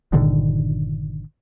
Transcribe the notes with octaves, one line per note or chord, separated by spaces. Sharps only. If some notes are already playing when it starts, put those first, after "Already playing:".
G1 A#2 D3 D#3